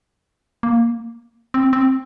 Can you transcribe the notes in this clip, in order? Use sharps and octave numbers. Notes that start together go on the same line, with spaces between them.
A#3
C4
C4